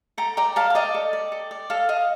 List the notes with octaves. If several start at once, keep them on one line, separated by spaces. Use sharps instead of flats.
A4 G5 A#5
D5 G5 A#5
A4 F5 A5
F5
D5 D#5 G5
A4
D5
A4
D5
A4 F5
D#5 F5